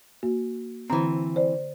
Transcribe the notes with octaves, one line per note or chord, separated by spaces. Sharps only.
A#3 F#4
D3 E3 C4 A#5
C5 D5